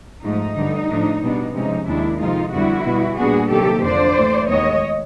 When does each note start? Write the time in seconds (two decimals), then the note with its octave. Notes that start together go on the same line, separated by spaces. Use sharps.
0.24 G#2 F3 A3 D#4
0.56 G2 D3 G3
0.90 A2 F3 A3 D4
1.22 B2 G3 B3 D4
1.54 C3 F3 G#3 C#4 D#4
1.87 D#2 D#3 G#3 D4 E4
2.20 F2 C3 F3 G#3 D#4 F4
2.52 F2 D3 G3 B3 E4 F#4
2.85 B2 G3 B3
3.18 A#2 G3 B3 D4 F#4 G#4
3.51 C3 D#3 F#3 A#3 G4 A4
3.84 F2 D3 F3 A#3 D4 C5 D5
4.17 A2 E3 A3
4.49 D#2 D#3 G#3 B3 C#5 D#5